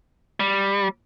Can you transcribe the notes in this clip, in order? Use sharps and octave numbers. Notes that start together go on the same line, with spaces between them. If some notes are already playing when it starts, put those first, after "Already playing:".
G3